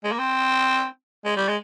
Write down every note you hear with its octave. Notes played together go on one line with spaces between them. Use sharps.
G#3
A#3
C4
G#3
G3
G#3